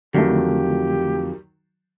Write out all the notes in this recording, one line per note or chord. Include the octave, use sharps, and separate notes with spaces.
F2 D3 D#3 F#3 A3 G4